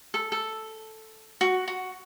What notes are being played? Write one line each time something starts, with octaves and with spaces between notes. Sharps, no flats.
A4
A4
F#4
F#4